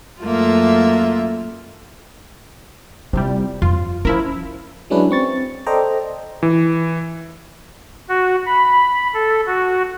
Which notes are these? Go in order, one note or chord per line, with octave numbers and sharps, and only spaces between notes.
F#2 A3 A#3 F4 E5
C3 G3 E4 F4
F2 F4
F3 C#4 E4 A#4
F#3 G#3 C#4 D4 E4 B4
C4 C#6 A6
A4 C5 D5 D#5 G5 A#5
E3
F#4
B5
A4
F#4